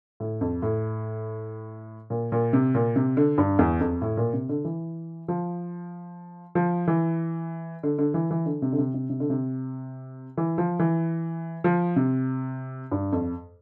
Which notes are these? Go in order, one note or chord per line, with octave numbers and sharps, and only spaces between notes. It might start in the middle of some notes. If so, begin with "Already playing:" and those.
A2
F2
A2
A#2
A#2
C3
A#2
C3
D3
G2
E2
F2
A2
A#2
C3
D3
E3
F3
F3
E3
D3
D3
E3
E3
D3
C3
D3
C3
C3
C3
D3
C3
E3
F3
E3
F3
C3
G2
F2